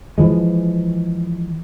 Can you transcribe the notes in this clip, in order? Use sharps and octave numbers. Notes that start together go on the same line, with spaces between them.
E3 F3 G#3